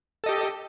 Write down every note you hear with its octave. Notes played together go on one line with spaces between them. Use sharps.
G4 A4 D#5